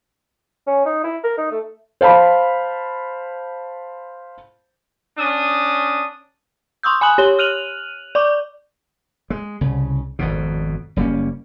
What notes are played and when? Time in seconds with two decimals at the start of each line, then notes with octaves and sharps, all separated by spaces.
0.67 C#4
0.85 D#4
1.04 E4
1.24 A#4
1.38 D#4
1.51 A3
2.01 C5 F5 A5 B5
5.18 C#4 D4 D#6
6.83 C6 C#6 D#6 E6 G6
7.01 G#5 B5 D#6 F#6 F#7
7.18 G4 C#5 G7
7.39 F6 F#6 D#7 F7 F#7
8.15 D5 C#6 D6
9.30 G#3
9.61 C2 C#3
10.19 G#1 F2 B2
10.96 F#1 G3 A#3 C#4